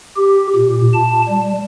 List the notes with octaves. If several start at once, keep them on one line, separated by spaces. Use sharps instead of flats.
G4
A#2
A5
G3